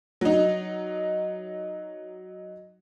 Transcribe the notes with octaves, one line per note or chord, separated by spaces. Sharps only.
F#3 D#4